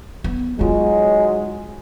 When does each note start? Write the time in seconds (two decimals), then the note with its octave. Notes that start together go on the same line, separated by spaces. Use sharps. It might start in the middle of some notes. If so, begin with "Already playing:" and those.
0.24 B3
0.59 F#3 G#3 D#4 F4